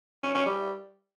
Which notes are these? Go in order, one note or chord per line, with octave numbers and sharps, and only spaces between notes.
C#4
C#4
G3